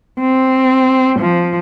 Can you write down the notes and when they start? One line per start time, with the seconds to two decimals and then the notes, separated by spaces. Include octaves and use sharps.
0.20 C4
1.20 F3